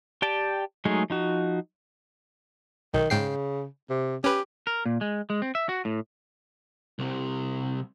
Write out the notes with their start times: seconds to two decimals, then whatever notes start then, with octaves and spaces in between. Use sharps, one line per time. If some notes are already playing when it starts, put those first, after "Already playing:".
0.22 G4 D5 G5 A5
0.85 F#3 G#3 A3 D#4 G#4
1.10 F3 D#4 F#4
2.94 B1 D#3
3.10 G#2 C#3 G5 C7
3.90 C3
4.24 C#4 G4 B4
4.67 A#4
4.86 A#2
5.01 G#3
5.30 G#3
5.42 C4
5.55 E5
5.69 F#4
5.85 A2
6.99 C2 C3